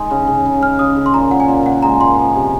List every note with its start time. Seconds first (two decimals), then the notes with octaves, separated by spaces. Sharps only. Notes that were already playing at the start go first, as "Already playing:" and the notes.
Already playing: G#3 D#4
0.11 C#3
0.27 C#3
0.46 C#3
0.62 C#4 F6
0.79 C#3 D#6
0.96 C#3
1.06 C6
1.14 A#2 A#5
1.31 A#2 F#5
1.40 G#5
1.48 A#2
1.65 A#2 F#5
1.83 G#3 A#5
2.00 A#2 C6
2.18 F3
2.34 C3